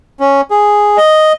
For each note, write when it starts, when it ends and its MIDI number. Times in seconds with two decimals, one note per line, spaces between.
0.20 0.41 61
0.51 0.97 68
0.97 1.32 75